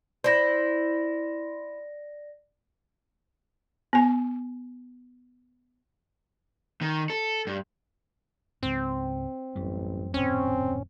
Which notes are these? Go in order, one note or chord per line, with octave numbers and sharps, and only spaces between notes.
E4 C5 D5 A#6
B3 G#5
D#3
A4
G2
C#2 G#2 C4
A1 F#2 G3
D#1 F#2 A2 C4 C#4